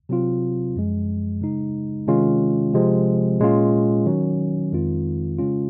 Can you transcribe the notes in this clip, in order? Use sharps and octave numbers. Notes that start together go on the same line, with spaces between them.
C3 F#3 C4 F4
F#2 F3 G#3
C#3 G#3 D#4
C3 D#3 G#3 C#4 F4
C3 F3 G#3 C4
A#2 G#3 C#4 F4
D#3 F#3 C#4
F2 D#3 G#3 C4 F4
C#3 G#3 C#4 F4